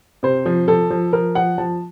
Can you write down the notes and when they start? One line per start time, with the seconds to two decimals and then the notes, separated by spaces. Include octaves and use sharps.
0.23 C3 C5
0.46 F3
0.68 F3 A4
0.90 F3
1.13 F3 A#4
1.35 F3 F#5
1.58 F3 A5